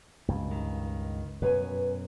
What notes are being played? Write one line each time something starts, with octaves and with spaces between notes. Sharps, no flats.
C#2 G2
D#3
F#2 B2 B4 C#5 G#5